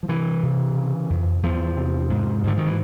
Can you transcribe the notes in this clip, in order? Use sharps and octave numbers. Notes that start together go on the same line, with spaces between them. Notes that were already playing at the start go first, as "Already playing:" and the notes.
F3
C3 E3
C3
C#3
F2
E2 F3
C3
G#2
G#2 D3
D#3
E3